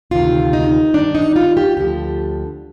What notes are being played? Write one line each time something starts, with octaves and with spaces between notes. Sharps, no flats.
D2 C3 D#3 F4
D#4
G2 D#3 D4
D#4
F4
G4
D2 D3 F3 G4